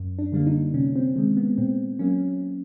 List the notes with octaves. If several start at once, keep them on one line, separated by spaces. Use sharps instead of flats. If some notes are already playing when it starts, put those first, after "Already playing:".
Already playing: F#2
D4
D3 G3 A#3 D4
D#4
C3 C#4
C4
D#3 G#3 C4
B3
A#2 C4
F#3 A#3 C#4